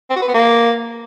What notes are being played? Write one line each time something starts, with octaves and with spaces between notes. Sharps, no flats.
C4
F#4
B4
B3
A#3